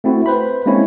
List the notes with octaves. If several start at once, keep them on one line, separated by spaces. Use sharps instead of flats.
A3 C4 E4 F#4
B4 C5 B5
G#3 A#3 C4 C#4 E4 C#5